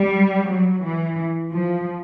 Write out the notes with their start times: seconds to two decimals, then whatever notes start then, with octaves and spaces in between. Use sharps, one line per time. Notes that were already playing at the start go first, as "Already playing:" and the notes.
Already playing: G3
0.48 F#3
0.83 E3
1.52 F3